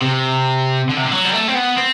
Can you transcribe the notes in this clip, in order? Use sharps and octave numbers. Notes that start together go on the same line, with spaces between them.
C3
D3
C3
D3
F#3
G3
A3
C4
B3
C4